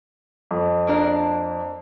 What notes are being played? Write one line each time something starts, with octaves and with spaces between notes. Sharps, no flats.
F2
A#3 D4 A#4